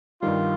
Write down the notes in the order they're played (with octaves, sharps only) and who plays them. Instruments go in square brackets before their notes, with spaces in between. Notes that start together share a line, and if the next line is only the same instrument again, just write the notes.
[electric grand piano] G2 D#3 G3 [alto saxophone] F4